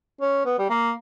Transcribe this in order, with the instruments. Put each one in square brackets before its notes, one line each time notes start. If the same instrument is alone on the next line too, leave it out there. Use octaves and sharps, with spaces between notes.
[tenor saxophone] C#4
B3
G3
A#3